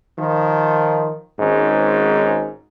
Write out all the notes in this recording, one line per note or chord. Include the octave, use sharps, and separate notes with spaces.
D#3 F3
G#1 G#2 C#4